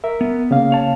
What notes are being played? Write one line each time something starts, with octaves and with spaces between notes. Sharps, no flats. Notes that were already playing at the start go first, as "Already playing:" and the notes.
A#4 E5
B3
C#3 A#3 F5
C#5 A5